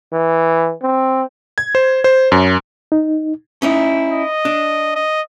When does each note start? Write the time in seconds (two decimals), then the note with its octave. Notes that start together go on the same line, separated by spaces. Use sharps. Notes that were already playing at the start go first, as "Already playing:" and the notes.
0.12 E3
0.82 C4
1.58 G#6
1.75 C5
2.04 C5
2.32 F#2
2.92 D#4
3.62 C#4 D#4 E4
4.12 D#5
4.45 D4
4.95 D#5